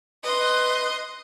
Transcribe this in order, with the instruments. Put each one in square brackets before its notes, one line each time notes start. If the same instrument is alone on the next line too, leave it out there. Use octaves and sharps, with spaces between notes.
[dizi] B4 [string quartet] D#5 C6